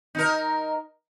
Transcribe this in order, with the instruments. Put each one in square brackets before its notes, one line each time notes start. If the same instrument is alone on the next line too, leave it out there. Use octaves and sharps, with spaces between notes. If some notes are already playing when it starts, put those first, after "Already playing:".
[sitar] D#4 A#4